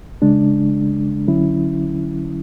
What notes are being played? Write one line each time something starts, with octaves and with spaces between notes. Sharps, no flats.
C#3 G#3 D4
D3 F#3 C#4 E4